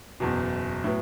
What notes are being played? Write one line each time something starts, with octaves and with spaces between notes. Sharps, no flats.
F#1 E2 B2
A2 F#3 B3